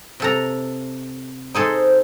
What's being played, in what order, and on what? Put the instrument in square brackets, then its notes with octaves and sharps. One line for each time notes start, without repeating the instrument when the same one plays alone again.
[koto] C3 A4 A#5
[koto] D#4 G#4 A4 [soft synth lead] C5